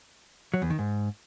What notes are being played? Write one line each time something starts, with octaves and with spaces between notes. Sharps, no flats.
F#3
E2
D#3
G#2